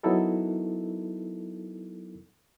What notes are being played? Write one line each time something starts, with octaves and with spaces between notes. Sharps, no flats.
F#3 B3 D#4 E4 A4 A#4